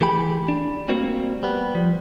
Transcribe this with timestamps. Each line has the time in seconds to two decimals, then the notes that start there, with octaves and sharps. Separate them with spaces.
0.01 E3 A3 G4 G#4 G5 B5
0.48 D4
0.88 G3 A3 A#3 C4 F#4
1.43 G3 B3
1.75 F3